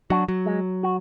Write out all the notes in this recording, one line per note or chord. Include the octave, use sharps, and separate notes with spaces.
F#3 D4 F#4
F#3
G#3
F#4